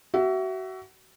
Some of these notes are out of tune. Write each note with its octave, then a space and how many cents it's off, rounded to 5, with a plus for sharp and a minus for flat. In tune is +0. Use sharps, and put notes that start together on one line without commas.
F#4 +30 E5 +10